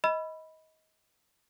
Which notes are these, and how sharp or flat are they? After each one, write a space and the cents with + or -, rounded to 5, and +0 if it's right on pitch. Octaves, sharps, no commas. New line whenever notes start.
D#5 +25 B5 +0 E6 +35